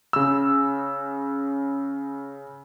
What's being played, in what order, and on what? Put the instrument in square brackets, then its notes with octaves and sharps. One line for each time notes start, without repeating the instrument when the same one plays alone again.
[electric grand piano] C#3 E6